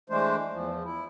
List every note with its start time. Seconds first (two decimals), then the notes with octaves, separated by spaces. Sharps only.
0.10 E3 G#3 A3 D4 C5
0.52 E2 F3
0.84 E4